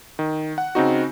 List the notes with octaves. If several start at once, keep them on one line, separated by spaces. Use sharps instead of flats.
D#3
F#5
C#3 C4 D#4 F#4